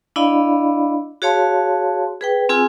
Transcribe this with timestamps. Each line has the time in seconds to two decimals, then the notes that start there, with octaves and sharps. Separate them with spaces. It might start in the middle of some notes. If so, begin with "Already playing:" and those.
0.16 D4 E4 D5 D#5 F5 B5
1.22 F#4 G#4 C#5 F5 A5 C6
2.21 G#4 B4 G5
2.49 C4 F4 G#4 G#5 E6